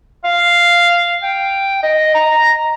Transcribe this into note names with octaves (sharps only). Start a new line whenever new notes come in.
F5
G5
D#5
A#5